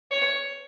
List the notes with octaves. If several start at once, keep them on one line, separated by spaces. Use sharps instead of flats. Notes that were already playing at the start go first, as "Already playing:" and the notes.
C#5